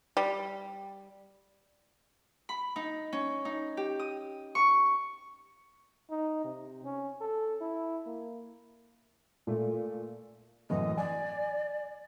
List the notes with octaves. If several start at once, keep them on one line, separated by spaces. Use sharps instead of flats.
G3
B5
D#4
C#4
D#4
G4
D#6
C#6
D#4
C3
C#4
A4
E4
A#3
A#2 A3
F#2 A2 E3 D#5
D5 G#5